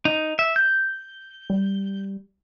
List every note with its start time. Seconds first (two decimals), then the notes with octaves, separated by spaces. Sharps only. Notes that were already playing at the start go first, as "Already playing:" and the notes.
0.05 D#4
0.39 E5
0.56 G6
1.50 G3